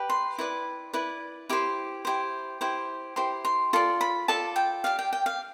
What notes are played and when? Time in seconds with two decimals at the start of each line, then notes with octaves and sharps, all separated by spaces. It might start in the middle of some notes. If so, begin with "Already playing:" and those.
Already playing: G4 B4 D5
0.10 C6
0.38 E4 B4 D5
0.93 E4 B4 D5
1.49 E4 G4 C5 D6
2.05 E4 G4 C5
2.61 E4 G4 C5
3.16 E4 G4 C5 C6
3.45 C6
3.73 F4 A4 D5 C6
4.01 B5
4.28 F4 A4 D5 A5
4.56 G5
4.84 G4 D5 F5
4.99 G5
5.13 G5
5.26 F5